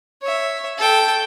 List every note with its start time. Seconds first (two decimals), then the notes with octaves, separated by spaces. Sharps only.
0.22 C#5 E5
0.78 A4 G5